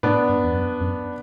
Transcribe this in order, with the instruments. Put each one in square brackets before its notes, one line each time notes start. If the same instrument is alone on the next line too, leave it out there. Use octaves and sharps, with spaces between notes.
[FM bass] A2 [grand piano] B3 D4
[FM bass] G2
E2
F#2
F#2